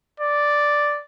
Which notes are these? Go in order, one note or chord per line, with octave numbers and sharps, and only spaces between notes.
D5